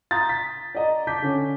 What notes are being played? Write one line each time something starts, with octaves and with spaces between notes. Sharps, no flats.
A#5 C6 D#6 G6 A6
B6
D5 D#5 A#5
A5 D6 G6 B6
D3 C#4